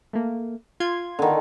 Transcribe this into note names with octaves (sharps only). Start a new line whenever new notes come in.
A3 A#3
F4 C6 G#6
D3 D#3